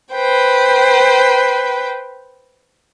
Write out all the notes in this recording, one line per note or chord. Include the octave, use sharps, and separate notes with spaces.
B4 C5 G5